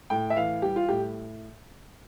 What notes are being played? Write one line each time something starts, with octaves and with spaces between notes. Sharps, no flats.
A2 G5
E5
E3 F5
G3 G4
F4
A2 G4